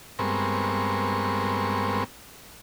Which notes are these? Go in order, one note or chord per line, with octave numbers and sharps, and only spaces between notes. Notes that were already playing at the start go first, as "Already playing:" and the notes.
G2 G#3 B3 C4 A#4 C#6